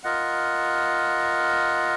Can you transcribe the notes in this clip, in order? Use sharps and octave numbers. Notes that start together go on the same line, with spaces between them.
F4 A#4 D#5 F#5